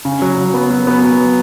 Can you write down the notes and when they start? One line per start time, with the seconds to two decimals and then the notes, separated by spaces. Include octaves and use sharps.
0.05 C#3
0.22 F#3
0.38 F#3
0.54 B3
0.70 F#3
0.87 B3
1.04 F#3